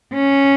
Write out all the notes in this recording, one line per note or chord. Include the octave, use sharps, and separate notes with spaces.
C#4